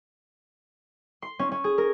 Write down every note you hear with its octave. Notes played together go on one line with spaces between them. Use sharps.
C6
C#4
C#4
G#4
A#4